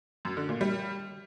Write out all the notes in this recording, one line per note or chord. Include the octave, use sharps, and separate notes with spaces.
F#2
D3
A#2
G3